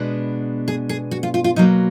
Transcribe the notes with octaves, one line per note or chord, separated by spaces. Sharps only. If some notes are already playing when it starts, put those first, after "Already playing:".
Already playing: B2 G#3 B3 D4
G#4
G#4
F#4
F4
F4
F4
B2 F#3 A#3 D#4